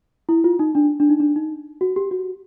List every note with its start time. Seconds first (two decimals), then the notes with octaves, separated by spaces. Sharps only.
0.29 E4
0.44 F4
0.59 D#4
0.75 D4
1.00 D4
1.10 D#4
1.20 D4
1.36 D#4
1.81 F#4
1.96 G4
2.11 F#4